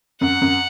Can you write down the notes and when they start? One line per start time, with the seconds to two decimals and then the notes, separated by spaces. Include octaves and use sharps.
0.21 F#2 F#5
0.42 F#2